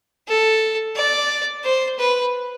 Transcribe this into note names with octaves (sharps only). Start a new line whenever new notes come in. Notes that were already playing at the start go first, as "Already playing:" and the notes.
A4
D5
C5
B4